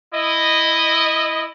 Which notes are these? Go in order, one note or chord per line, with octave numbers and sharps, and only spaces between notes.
E4 D#5